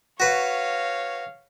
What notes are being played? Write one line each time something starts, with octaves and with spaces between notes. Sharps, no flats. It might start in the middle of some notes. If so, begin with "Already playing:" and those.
F#4 B4 C#5 F5